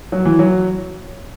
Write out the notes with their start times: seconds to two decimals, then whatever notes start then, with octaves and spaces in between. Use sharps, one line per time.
0.12 F#3
0.25 E3
0.39 F#3